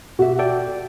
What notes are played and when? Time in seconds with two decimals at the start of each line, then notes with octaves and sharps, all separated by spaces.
0.19 B2 F#4 G4 E5
0.39 A4 D5 G5